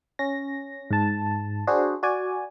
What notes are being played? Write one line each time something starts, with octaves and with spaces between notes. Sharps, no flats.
C#4 A#6
G#2 A5
D4 F#4 G#4 C5
F#4 D5 G#5